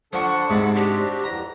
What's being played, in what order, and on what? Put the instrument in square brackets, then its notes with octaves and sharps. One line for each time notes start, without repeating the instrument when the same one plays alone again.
[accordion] D3 D4 A4 [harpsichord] F3 C#6 [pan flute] F#5
[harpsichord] G#2 C3 A5 [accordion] B5
[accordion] C4 D4 F#4 [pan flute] G4
[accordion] F2 E3 [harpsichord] A#5